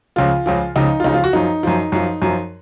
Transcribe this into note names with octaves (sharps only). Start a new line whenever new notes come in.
C#2 C#3 F3 F4
C#2 C#3 F3
C#2 C#3 F3 D#4
F4
C#2 C#3 F3 D#4
F4
F#4
F#2 F3 D#4
F#2 F3
F#2 F3
F#2 F3